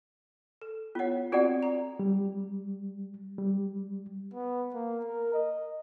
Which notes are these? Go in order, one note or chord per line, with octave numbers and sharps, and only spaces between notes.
A4
B3 F4 C#5 F#5
C4 F4 F#4 A4 D5 F#5
A#5
G3
G3
B3
A#3
A#4
D#5